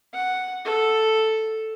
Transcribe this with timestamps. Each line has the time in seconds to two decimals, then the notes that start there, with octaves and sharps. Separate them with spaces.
0.14 F#5
0.65 A4